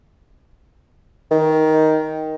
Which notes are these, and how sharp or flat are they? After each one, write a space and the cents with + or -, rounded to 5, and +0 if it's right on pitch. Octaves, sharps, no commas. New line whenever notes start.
D#3 +10